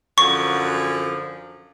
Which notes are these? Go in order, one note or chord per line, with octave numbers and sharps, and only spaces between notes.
F#2 D3 F3 C#6